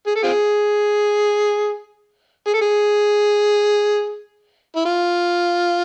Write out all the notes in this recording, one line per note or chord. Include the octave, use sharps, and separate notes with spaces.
G#4
A4
C4 F4 G#4
G#4
A4
G#4
E4
F4